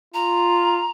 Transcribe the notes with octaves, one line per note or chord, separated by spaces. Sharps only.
F4 A#5